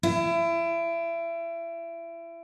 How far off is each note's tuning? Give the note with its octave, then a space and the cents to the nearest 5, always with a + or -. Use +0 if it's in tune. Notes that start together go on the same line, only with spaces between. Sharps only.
E4 +30